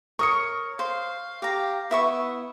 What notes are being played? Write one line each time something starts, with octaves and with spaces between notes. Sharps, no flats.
A#4 C#5 C#6 D#6 C#7
C5 F5
G4 F5 A#5
B3 E4 E5 C#6